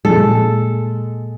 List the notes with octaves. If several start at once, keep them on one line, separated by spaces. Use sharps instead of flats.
A#2 G#3 A4